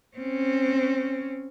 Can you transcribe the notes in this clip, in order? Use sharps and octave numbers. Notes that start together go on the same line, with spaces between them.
C4 C#4